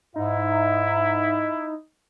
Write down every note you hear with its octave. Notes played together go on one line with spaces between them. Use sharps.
G#2 D#4 E4 E5